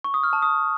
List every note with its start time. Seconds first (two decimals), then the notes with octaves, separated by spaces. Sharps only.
0.04 C#6
0.14 D#6
0.23 F6
0.33 A5
0.42 D#6